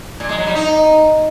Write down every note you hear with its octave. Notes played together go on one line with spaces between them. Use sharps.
A#2
G#3
F#3
G3
D#4